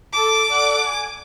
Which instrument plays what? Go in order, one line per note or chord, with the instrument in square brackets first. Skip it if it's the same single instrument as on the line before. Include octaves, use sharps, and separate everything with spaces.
[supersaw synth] A4 A5 [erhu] D6
[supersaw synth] A4 D5 F#5
G#5